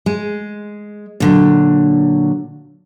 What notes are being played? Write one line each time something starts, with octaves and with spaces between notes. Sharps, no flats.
G#3
A#2 D3 F#3